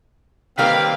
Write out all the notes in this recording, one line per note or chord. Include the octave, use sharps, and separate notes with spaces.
D#3 G3 A#3 C4 B4 F5